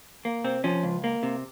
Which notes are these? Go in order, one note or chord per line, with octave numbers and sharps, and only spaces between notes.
A#3
C3 C4
F3 C#4
C#2
A#3
C3